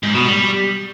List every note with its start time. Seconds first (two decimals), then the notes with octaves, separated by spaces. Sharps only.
0.03 G#2
0.14 B2
0.26 G3